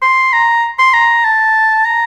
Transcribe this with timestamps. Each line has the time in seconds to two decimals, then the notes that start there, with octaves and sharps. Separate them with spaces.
0.02 C6
0.33 A#5
0.79 C6
0.94 A#5
1.25 A5
1.86 A#5